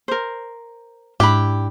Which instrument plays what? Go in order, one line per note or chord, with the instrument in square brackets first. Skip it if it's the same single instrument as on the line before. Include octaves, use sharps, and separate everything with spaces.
[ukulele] A#4 C5
[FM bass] G#2 [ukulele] D4 E4 B5 [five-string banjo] G4